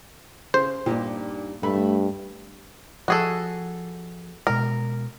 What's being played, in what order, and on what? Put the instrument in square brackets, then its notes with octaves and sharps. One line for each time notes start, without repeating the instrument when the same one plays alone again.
[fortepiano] C#3 [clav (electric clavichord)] C5
[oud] G2 D#4 G4 [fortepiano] A#2
[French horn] G2 [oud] A3 [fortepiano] B5
[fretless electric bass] F3 [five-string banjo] F#4 G#4 A4
[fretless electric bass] B2 G#3 [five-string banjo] A#4